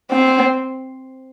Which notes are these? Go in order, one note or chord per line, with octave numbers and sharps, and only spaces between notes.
C4